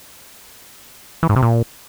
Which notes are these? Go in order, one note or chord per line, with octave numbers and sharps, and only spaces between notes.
E3
G#2
C3
A#2